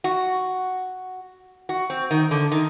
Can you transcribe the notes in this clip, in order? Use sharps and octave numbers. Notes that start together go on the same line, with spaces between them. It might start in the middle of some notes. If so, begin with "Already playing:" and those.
F#4
F#4
C4
D#3
D3
D#3